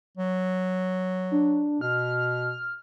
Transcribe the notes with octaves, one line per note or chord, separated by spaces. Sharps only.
F#3
D4
B2 F6